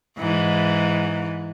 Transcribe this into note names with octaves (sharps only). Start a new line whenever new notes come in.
G#2 E3